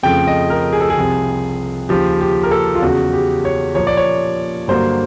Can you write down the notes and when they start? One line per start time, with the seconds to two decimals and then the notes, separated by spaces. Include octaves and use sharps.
0.03 F2 C#3 F3 A3 G5
0.27 D#5
0.50 A#4
0.73 G#4
0.81 A4
0.90 G#4
0.97 C2 C3 F3
1.89 D#2 C#3 F3 G4
2.21 G4
2.43 A#4
2.51 A4
2.75 F4
2.82 E2 C#3 F#3 F#4
3.13 G4
3.45 C#5
3.75 A#2 F3 A#3 C#5
3.87 D5
3.97 C#5
4.68 G2 D3 F#3 A#3 C5